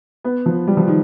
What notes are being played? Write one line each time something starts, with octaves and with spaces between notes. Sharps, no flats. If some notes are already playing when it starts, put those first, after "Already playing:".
B3
F3
G3
F3
D#3